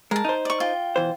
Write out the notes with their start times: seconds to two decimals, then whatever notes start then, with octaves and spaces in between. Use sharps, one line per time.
0.11 G#3 A#4 A5
0.25 D#4 C5
0.45 D5 C#6
0.60 F4 G5
0.96 B2 E3 C5